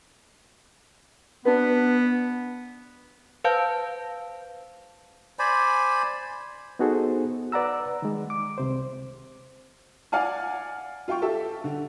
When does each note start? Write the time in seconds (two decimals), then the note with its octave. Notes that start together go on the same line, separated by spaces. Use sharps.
1.45 B3 D4 F#4 B4
3.44 B4 C5 F5 A5 G6
5.39 C5 D5 G#5 B5
6.79 B3 D#4 F#4 G#4 A4 C5
7.52 B4 D5 F#5 A#5 E6
8.02 D#3 G#3
8.30 D6
8.58 C2 C3 C5
10.12 D5 F5 F#5 G#5 F6
11.08 F4 F5 G5 C#6
11.22 G4 A4 E5
11.64 D3